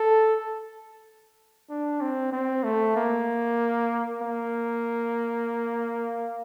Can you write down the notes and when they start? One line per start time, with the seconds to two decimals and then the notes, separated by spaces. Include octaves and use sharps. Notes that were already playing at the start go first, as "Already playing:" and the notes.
Already playing: A4
1.70 D4
2.01 C4
2.32 C4
2.64 A3
2.96 A#3
4.21 A#3